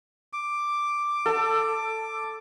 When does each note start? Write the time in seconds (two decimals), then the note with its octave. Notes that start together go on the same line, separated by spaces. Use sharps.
0.33 D6
1.26 A4 A5